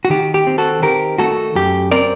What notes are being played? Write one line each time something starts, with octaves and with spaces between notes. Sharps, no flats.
F#4
D#3 G4
G4
C4
F#4 A4
D#3 G4 A#4
A3 F#4 A4
F#2 G4
C4 A#4 D5